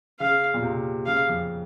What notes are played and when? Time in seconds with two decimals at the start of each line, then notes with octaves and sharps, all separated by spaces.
0.20 C#3 F5
0.54 A#2
0.63 C3
1.06 C#3 F5
1.29 F2